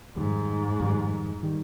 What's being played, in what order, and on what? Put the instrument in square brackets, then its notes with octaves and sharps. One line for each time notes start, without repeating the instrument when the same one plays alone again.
[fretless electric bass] F2 D#3 G3 [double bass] G#2
[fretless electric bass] F2 D#3 G3
D#3 G3